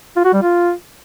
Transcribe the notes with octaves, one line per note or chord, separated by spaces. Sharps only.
F4
F#4
G3
F4